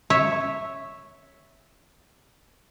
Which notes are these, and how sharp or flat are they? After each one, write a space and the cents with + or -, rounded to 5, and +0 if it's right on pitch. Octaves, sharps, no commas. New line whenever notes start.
C#5 -5 E5 -5